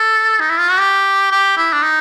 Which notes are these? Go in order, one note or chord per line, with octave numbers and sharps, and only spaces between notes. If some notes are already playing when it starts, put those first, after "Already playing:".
Already playing: A4
D#4
E4
F4
F#4
G4
G4
E4
D4
D#4